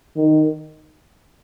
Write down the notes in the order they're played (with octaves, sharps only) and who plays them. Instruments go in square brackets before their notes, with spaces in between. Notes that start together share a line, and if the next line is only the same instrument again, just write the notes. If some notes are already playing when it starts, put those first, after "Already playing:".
[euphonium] D#3